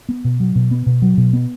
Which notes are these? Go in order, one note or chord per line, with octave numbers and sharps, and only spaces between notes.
B3
B2
F#3
B2
B3
B2
F#3
B2
B3